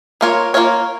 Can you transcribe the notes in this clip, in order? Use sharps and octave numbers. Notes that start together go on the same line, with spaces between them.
A#3 F4 A#4 C#5
A#3 F4 A#4 C#5